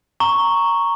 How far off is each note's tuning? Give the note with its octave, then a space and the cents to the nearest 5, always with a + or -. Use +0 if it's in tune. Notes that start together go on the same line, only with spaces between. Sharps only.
A#5 -5 C#6 +0